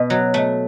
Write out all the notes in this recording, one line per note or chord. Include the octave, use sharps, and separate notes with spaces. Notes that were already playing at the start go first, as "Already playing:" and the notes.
Already playing: B2
F#3
A3